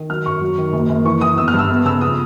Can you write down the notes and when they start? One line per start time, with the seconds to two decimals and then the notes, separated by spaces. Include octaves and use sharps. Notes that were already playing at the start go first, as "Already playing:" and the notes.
Already playing: D#3
0.10 F#3 F6
0.26 F#2 C#6
0.41 F#3
0.58 D#3
0.73 F#1
0.89 F#1
1.05 E3 C#6
1.21 E3 D#6
1.37 G1 E6
1.48 F6
1.54 G2 E6
1.69 B3
1.85 C#3 E6
2.01 F3 D#6